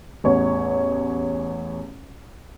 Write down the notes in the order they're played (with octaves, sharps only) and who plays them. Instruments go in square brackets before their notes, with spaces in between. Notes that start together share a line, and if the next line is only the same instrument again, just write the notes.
[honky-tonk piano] A1 E2 C#5